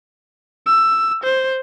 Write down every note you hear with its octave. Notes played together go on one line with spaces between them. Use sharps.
E6
C5